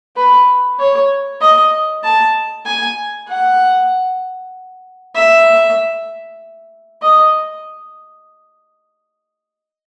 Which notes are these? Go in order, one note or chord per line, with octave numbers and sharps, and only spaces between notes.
B4
C#5
D#5
A5
G#5
F#5
E5
D#5